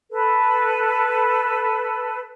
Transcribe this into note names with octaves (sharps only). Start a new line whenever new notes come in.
A4 B4